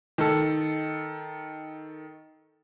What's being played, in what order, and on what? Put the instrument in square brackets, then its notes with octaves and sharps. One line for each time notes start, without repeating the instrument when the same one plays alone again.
[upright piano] D#3 A4